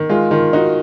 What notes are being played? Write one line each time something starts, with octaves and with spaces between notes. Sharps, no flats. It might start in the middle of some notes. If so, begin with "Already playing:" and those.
Already playing: D#3
G#3 F4
D#3 F4
D#4 F#4